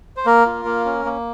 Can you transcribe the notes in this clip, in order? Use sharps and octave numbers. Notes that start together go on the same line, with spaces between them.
C5
A#3 A#4
F4
A#3
C#4
A#3